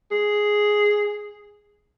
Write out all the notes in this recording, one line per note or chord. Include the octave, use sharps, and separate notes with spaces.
G#4